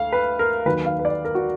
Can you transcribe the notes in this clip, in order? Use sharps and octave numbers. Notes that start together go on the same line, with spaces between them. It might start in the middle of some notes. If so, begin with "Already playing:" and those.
Already playing: D2 F5
B4
A#4
D#2 D#3 F#3 B4
F5
B4
D5
A#4
F#4